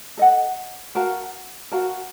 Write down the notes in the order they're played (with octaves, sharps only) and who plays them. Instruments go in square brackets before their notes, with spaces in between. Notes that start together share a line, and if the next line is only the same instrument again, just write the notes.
[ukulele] A4 D#5 F#5
F#4 A#4 F5 A5
F#4 A#4 F5 A5